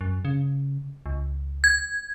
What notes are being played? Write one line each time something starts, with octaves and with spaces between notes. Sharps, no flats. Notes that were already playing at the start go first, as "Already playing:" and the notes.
F#2
C#3
C#2
G#6